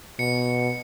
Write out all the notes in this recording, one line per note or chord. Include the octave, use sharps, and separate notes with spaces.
B2 C#7